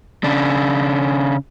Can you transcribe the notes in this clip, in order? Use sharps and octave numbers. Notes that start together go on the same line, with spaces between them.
C#3 D4